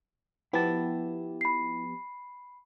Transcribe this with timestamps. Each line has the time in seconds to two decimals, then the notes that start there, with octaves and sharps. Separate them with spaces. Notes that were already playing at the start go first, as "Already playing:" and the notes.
0.53 F3 B3 E4 G4 A5
1.41 B5 C7